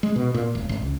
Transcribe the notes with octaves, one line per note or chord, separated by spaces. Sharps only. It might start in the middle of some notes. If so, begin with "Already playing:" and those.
G#3
B2
A#2
E1
G#1
C#2